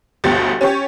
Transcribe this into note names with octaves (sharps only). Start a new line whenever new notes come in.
G1 D2 B2 G4 A6
C#4 G4 C#5